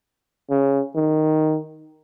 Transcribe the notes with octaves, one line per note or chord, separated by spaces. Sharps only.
C#3
D#3